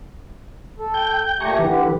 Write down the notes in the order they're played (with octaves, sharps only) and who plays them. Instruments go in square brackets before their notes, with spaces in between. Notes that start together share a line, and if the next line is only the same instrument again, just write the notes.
[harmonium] A4
[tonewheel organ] G5 G6
[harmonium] A#2 A3 G4 [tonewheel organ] G#5 A#5 C#6
[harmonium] D3 G4 [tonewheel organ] E3 B4